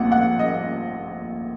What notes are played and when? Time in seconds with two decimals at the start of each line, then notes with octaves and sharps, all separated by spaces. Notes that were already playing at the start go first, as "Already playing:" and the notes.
Already playing: A#1 A#2 A3 C4 F#5
0.12 F#5
0.39 D#5